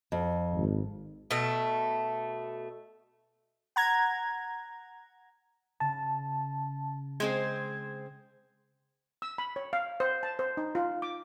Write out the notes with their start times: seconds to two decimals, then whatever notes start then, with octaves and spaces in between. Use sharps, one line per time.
0.12 F2
0.55 G#1
1.31 B2 A3
3.76 F#5 A#5 G#6
5.80 C#3 A5
7.20 G#3 C4 C5 G#6
9.22 E6
9.38 B5
9.56 C#5
9.73 F5
10.00 C5
10.23 A5
10.39 C5
10.57 D#4
10.75 F4
11.02 D6